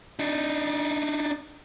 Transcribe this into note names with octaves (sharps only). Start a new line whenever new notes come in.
D4 D#4